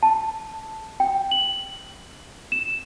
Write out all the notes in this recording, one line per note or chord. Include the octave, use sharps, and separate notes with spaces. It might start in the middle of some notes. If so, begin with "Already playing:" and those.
A5
G5
F#7
E7